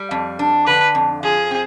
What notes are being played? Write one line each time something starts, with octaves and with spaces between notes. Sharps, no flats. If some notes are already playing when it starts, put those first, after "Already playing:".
Already playing: G3
F2
D4
D3 B4
F2
F3 G#4
C4